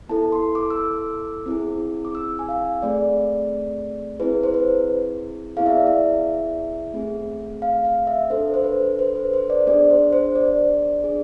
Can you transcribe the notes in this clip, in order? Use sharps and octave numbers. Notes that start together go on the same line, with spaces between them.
B3 E4 A4 A5
C6
D6
E6
D6
C4 E4 G#4
D6
E6
G#5
F5
A3 C4 G#4 D5
C4 E4 G#4 B4
C5
B4
B3 E4 G#4 F5
E5
D5
E5
A3 C4 G#4
F5
F5
E5
D4 A4 C5
C5
B4
C5
B4
C5
D5
B3 D4 G#4 D5
C5
C5
D5
D4 G#4